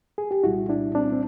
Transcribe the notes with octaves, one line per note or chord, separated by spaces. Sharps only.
G#4
G4
C2 A#2 G3 E4 F#4
D4 E4
C4 D4
C4